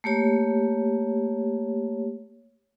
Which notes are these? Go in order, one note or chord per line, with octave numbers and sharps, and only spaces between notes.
A3 A#3 G4 C#5